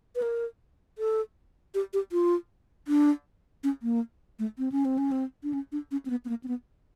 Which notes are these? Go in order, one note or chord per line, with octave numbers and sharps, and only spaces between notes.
B4
A#4
A4
G4
G4
F4
D4
C#4
A#3
A3
C4
C#4
C4
C#4
C4
D4
C#4
D4
C#4
C4
B3
B3
A#3
C4
B3